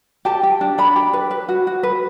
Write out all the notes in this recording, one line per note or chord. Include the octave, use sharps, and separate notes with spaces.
G4 A5
G4
D4
D4 B5
G4
B4
B4
F#4
F#4
B4